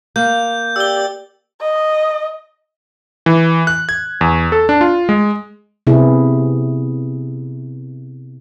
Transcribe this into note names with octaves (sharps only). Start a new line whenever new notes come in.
A#3 G6
G4 D5 E6 G7
D#5
E3
F#6
G#6
E2
A4
D4
F4
G#3
C3 B3 E4 G#4